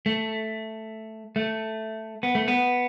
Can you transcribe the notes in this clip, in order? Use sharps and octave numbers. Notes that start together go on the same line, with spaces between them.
A3
A3
B3
A3
B3